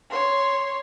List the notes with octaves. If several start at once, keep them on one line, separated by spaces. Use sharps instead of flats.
C#5 C6